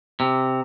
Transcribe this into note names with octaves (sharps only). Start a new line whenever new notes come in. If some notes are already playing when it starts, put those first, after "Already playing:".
C3